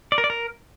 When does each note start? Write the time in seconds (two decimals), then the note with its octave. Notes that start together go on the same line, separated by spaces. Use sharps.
0.12 D5
0.18 A#4
0.24 D5
0.30 A#4